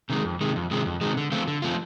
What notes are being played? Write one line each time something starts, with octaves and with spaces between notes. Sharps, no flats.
C3 D#3 G#3
F2
C3 D#3 G#3
F2
C3 D#3 G#3
F2
C3 D#3 G#3
D3
F3 A3 C4 F4
D3
F3 A3 C4 F4